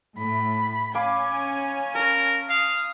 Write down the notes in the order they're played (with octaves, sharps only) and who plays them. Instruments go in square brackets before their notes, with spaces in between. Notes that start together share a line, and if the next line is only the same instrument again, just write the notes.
[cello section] A2 [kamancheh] B5
[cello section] C#4 [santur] F5 B5 D6 [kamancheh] G#5
[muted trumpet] A#4 [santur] A5 C#6
[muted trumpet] F5 [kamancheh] D#6